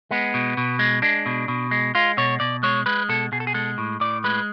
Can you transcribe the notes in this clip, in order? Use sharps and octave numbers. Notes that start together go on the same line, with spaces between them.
G#3 B3
B2
B2
G#3
G#3 D4
B2
B2
G#3
G#3 F4
B2 C#5
B2 D5
G#3 C#5
G#3 B4
B2 A4
B2 G#4
A4
G#4
G#3 A4
A2
A2 D5
G#3 B4